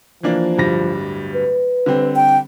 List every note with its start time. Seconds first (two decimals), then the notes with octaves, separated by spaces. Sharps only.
0.23 E3 F3 A#3 D4
0.57 D1 G2 A#6
1.34 B4
1.86 D3 G3 C4
2.16 G5